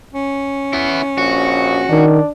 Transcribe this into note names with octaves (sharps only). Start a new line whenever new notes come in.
C#4
B3 E4
A#1 F#4
D#3 D4